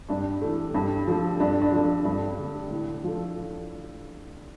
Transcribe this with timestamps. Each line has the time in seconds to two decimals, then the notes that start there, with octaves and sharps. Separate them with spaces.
0.09 G2 D4
0.41 E3 A3
0.75 G2
1.08 F3 A3
1.40 G2 D4
1.62 D4
1.72 F3 A3
1.83 D4
2.05 G2
2.39 D3 A3
2.71 A2
3.04 F3 A3